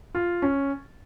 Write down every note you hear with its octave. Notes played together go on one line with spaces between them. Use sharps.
F4
C#4